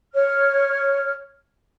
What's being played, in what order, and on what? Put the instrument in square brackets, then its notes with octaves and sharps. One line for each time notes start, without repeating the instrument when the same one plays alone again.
[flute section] C#5 F6